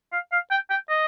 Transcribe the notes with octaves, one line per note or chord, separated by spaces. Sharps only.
F5
F5
G5
G5
D#5